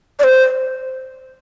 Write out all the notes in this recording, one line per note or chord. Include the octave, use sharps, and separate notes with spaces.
D5
C5